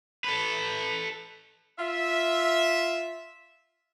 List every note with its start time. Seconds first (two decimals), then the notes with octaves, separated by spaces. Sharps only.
0.24 A4 B4
1.79 F4 E5